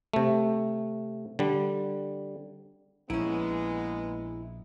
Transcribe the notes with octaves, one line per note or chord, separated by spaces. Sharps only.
C3 A3
D3 G3
A#1 G#3 A#3 B3 C#4 E4